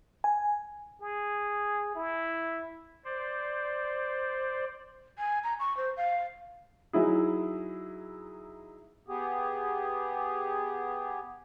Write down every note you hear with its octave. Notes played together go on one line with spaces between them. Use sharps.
G#5
G#4
E4
C5 D5
G#5
A#5
C#6
C5
F5
F#3 D#4 E4 G#4
B3 G4 G#4